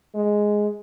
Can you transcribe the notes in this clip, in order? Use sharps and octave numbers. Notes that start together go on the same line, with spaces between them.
G#3